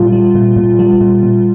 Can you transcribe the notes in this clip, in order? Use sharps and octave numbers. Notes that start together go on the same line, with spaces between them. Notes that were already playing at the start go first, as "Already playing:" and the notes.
Already playing: A#2 G3 F4
G3
A#2
A#2
G3
A#2
A#2